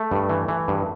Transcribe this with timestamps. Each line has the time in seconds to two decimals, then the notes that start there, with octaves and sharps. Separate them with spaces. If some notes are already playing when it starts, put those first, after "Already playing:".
Already playing: A3
0.11 G2
0.29 E3
0.48 E3
0.68 G2